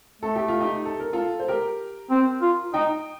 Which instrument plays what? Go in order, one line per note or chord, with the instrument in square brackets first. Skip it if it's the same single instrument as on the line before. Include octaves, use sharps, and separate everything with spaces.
[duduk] A3 [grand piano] A4
[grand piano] G4
F4
D#4 G4
A4
A#4
F4 A4
C5
G4 A#4
[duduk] C4
F4
[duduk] D#4 [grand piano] D#5 G5